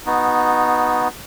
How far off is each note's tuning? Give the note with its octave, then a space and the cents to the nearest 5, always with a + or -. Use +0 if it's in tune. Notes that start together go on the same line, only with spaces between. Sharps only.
B3 +0 D#4 +0 F#4 -20